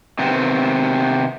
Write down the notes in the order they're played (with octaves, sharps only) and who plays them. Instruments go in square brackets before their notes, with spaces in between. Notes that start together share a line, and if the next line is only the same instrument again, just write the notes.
[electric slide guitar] C3 D#3 B3 C4